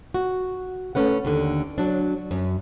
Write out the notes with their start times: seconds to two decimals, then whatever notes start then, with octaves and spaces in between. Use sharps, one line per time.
0.14 F#4
0.95 A3 C#4 B4 F#5
1.25 D#2 D3
1.78 F#3 D4
2.31 F#2